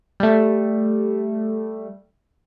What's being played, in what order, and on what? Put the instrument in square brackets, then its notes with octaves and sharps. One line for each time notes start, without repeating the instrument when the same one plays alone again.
[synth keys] G3 A3